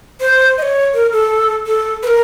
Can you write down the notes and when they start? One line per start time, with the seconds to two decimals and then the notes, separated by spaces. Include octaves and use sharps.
0.20 C5
0.58 D#5
0.62 C#5
0.94 A#4
1.12 A4
1.67 A4
2.03 B4
2.07 A#4